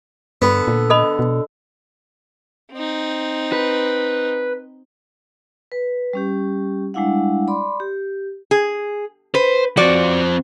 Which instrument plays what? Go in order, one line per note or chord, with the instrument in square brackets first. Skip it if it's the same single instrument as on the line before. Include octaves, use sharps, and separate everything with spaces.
[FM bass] G2 [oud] D3 [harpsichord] B3
[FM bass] A#2
[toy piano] A4 D#5 B5
[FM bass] B2
[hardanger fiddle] C4 D#4
[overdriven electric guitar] B4
[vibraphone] B4
G3 C#4 G4
G3 G#3 D4 E4 F5 F#5
D5 B5 C6 D6
G4
[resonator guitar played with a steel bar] G#4
[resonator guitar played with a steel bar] B4 [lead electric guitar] C5
[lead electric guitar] F3 C4 [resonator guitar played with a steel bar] F#4 D5